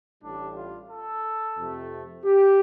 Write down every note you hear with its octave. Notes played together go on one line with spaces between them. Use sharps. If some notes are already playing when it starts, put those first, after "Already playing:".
A1 A2 G3 D4
F4
A4
F2 C3 A3
G4